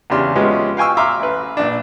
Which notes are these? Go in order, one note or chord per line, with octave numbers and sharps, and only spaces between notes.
E2 C#3 D4 G4 C6 F6
F3 G#3 B3 C#4 G4
F5 G5 G#5 C#6 E6
E5 F5 A#5 C6 D6 F6
A1 B4
A#1 D4